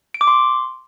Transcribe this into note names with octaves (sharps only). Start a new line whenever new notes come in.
D7
D6
C6